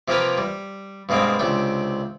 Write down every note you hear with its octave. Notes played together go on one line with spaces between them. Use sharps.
C3 F3 A#3 G4 A#4 B4
G3
G2 B2 G#3 A#3 C4
C#2 C3 D4 G5